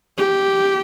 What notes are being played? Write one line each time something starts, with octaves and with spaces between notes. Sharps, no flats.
G4